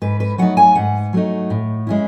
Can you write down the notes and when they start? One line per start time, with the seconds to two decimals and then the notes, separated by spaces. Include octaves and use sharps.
0.01 G#2 B4
0.20 B4
0.38 F#3 A3 D#4 F#5
0.57 G#5
0.75 G#2 F#5
1.13 F#3 A3 D#4
1.50 A2
1.87 G#3 C#4 E4